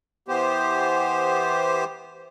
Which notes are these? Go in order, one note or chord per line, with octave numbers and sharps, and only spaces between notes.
E3 B3 G4 C5